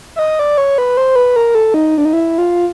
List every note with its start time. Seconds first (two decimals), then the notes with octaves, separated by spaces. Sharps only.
0.16 E5
0.19 D#5
0.39 D5
0.58 C#5
0.78 B4
0.97 C5
1.16 B4
1.36 A#4
1.55 A4
1.74 D#4
1.98 D4
2.05 D#4
2.13 E4
2.38 F4